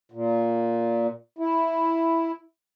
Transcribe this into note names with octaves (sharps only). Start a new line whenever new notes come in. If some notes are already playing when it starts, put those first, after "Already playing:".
A#2
E4